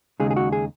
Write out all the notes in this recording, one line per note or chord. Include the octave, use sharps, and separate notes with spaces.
D#2 C#3 G#3 D#4 G#4
G#4
F#4
G#4